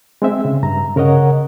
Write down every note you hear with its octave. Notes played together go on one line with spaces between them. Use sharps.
G#3 C4 E5
C#3
G2 A#5
C#3 A#4 C#5 D#5 F#5